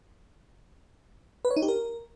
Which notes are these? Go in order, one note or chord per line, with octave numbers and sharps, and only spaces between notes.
B4
C#5
D#4
G4
A#4